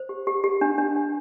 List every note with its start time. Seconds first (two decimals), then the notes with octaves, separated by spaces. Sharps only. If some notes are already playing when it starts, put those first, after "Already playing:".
Already playing: C5
0.09 G4
0.27 G4
0.44 G4
0.61 D4
0.78 D4
0.96 D4